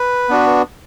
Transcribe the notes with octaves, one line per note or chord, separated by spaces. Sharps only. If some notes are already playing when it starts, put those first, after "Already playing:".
Already playing: B4
B3 D4 F#4